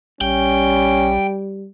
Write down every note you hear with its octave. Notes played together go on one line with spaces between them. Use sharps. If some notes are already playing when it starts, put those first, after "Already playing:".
A#1 G3 C#4 G5